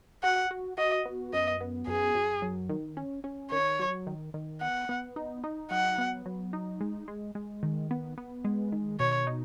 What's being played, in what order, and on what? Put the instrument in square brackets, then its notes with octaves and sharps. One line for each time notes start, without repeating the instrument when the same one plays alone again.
[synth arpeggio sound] F#4 [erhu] F#5
[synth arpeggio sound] F#4
[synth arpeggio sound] F#4 [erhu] D#5
[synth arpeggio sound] B3
[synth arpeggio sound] F#2 [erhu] D#5
[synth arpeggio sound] B3
[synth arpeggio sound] F#2 [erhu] G#4
[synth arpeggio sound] F#2
F#3
D#3
C#4
C#4
[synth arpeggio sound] D#3 [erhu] C#5
[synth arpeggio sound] F#3
D#3
D#3
[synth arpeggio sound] B3 [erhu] F#5
[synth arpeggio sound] B3
D#4
D#4
[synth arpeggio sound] F#3 [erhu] F#5
[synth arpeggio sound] B3
F#3
D#4
G#3
G#3
G#3
D#3
B3
B3
G#3
D#3
[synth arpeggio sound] B2 [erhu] C#5
[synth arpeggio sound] D#4